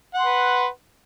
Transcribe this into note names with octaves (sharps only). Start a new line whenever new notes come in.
B4 F#5 C6